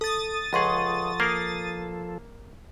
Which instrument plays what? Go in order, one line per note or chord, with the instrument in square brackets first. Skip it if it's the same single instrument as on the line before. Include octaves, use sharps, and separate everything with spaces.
[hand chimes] A4 [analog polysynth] D#6 A6
[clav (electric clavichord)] C#2 G#4 [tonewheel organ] F3 A4 [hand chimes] F#5 C6 C#6
[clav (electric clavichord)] A#3 A#4 [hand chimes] C7